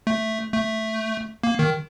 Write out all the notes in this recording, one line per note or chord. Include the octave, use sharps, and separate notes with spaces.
A3
A3
A#3
D#3